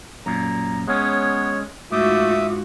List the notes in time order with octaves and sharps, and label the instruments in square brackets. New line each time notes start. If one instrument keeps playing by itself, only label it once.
[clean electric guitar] F#2 A#2 [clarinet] A#5
[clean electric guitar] G#3 C#4 [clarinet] B3 [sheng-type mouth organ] C#5
[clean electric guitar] G#2 [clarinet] A3 [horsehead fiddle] F4 F#4 [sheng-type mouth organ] E5 D6 D#6